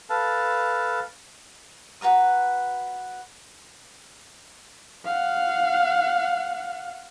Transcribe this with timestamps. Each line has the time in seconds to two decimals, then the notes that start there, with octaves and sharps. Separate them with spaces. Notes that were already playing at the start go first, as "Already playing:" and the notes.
0.10 A4 B4 F5 A5
2.01 F#4 B4 A#5 D#6
5.05 F5 F#5